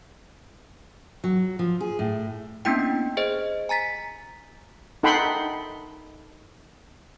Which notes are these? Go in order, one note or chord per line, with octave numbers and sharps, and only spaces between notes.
F#3
F3
G#4
A2
A#3 B3 C#4 D4 E4 G5
G#4 C5 D#5
G#5 A#5 A6 B6
D#4 A4 F#5 G5 B5 C6